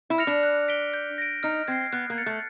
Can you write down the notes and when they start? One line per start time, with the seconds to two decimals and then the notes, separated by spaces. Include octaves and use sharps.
0.10 E4
0.18 F6 A#6 C#7 F7
0.27 D4
0.43 F#6
0.68 B6 D7 G7
0.94 G6
1.18 A#6 D7
1.43 D#4 F6
1.68 C4 G#6 C7
1.93 B3 F#6
2.10 A#3
2.18 A6 C#7
2.26 A3